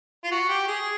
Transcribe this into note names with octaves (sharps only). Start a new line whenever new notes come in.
F4
F#4
G4
G#4